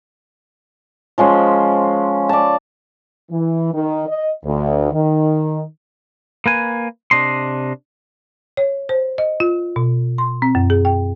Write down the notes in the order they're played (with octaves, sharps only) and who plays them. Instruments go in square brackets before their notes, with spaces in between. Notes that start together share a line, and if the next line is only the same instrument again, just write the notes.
[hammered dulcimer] F3 G#3 C#4 C5
D5 A5
[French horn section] E3
D#3
D#5
D2
D#3
[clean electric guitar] A#3 B4 G#5
C3 D4 D#5 C6
[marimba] C#5
C5
D#5
F4
B2
C6
C4
F#2
G#4
G5